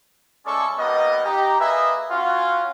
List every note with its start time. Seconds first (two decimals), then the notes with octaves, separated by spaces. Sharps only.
0.46 G#3 A3 C#4 A4 D5 C#6
0.78 G3 A#3 B3 D#4 D#5
1.26 D#4 G4 A#5
1.60 A#3 G#4 B4 D#5 E5
2.11 C#4 F4 F#4